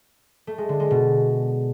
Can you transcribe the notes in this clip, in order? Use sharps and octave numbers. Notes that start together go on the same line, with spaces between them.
A3
G#3
D3
G#3
B2